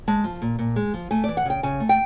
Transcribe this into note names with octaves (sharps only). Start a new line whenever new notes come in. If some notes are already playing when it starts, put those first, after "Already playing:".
G#3 A5
F3
A#2
A#2
G#3
F3
A3 G#5
E3 D5
F#5
C#3 G5
C#3 G#5
A3
G5